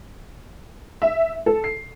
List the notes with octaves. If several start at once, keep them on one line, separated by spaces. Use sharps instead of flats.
E5
A4
C7